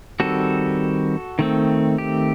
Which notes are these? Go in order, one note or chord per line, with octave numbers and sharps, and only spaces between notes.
D#3 G3 C4 F#4 A4
D#3 A3 C4
G4